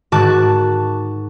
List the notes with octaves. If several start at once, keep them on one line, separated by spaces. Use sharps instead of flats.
G#2 D#3 F#4 A5 D6 F#6